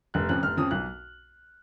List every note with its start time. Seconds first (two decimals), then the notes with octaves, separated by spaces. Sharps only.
0.14 F1 F#6
0.29 F2 C#3 F3 F#6
0.43 F1 F6
0.57 F2 C#3 F3 D#6
0.71 B1 F#6